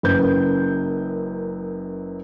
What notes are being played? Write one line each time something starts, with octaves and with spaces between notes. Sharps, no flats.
F#1 F#2 B4 G6